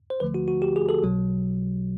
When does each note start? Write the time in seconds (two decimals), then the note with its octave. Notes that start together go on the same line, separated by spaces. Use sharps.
0.10 C5
0.20 D2 D3 F3 A3 B4
0.34 F#4
0.48 F#4
0.62 G4
0.76 G#4
0.89 A4
1.02 B1 B2 F#3